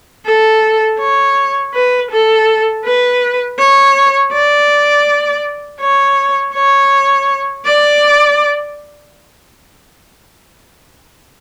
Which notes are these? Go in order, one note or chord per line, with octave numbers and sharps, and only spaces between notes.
A4
C#5
B4
A4
B4
C#5
D5
C#5
C#5
D5